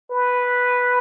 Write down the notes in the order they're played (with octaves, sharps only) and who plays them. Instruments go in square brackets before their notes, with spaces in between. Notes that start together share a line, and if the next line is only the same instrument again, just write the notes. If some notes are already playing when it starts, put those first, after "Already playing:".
[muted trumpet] B4